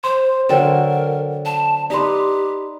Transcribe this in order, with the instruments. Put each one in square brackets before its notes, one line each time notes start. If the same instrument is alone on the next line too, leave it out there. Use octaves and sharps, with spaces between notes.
[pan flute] C5 [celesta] C6
[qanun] D3 F#3 A4 [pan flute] A#4 [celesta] C5 G5 E7
[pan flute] A5
[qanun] D#4 B4 [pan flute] G4 [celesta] D5 C6